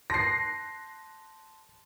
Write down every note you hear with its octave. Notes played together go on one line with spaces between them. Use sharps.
A5 C6 A#6 C7